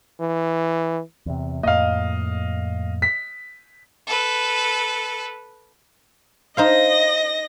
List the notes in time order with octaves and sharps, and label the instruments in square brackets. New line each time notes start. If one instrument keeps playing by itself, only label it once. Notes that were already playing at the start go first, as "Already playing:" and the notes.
[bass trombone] E3
[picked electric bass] E2 C3
[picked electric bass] F2 A2 A#3 [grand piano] D#5 F5
[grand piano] B6
[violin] A4 B4
[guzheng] D#4 C5 F5 [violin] D#5 A#6